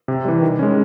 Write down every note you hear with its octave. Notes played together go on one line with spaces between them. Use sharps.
C3
E3 G3
D#3
G#3 C#4